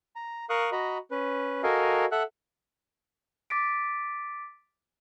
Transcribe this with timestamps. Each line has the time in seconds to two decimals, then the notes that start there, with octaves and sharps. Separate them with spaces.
0.16 A#5
0.50 A#4 F5 C#6 D#6 F#6
0.72 F#4 D#5 A#5 B5
1.11 C#4 B4
1.63 F#4 A4 A#4 D#5 F5 G#5
2.12 A4 E5 F#5 F#6
3.50 D6 A6 B6 D7